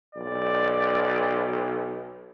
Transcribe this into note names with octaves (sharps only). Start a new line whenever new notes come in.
B1 D5